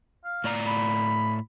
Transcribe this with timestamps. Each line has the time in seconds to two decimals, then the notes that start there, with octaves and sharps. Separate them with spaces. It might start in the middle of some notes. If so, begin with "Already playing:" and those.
0.25 F5
0.44 A2 D5 A#5
0.67 B5